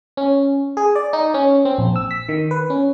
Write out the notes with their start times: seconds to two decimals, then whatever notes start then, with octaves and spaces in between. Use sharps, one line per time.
0.17 C#4
0.77 G#4
0.95 D5
1.13 D#4
1.34 C#4
1.65 C4
1.78 A#1
1.96 E6
2.11 B6
2.29 D#3
2.51 B4
2.70 C#4